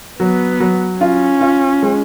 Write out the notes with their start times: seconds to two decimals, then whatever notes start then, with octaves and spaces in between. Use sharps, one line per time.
0.19 F#3 B3
0.60 F#3
1.00 C#4 F4
1.41 F4
1.83 G#3